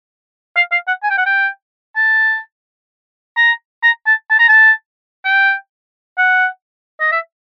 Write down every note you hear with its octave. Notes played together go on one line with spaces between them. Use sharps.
F5
F5
F#5
G#5
G5
F#5
G5
A5
A#5
A#5
A5
A5
A#5
A5
G5
F#5
D#5
E5